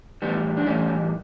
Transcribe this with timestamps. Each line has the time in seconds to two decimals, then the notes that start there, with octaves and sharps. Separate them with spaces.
0.22 A2 E3 G3 B3
0.57 D4
0.66 A2 E3 G3 A3 C#4